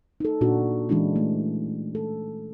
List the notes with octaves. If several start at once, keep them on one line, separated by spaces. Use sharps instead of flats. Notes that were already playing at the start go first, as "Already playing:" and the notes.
D#4 A4
A#2 D4 F#4
E3 G#3 C#4 D4 E4
A3
A4